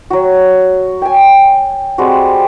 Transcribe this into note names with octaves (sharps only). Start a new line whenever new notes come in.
F#3 F#4
G5 G#5
G3 G#3 C4 F#4